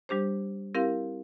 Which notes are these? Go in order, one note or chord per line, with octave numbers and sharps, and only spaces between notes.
G3 D4 G4 C5
C4 E4 G4 A#4 F5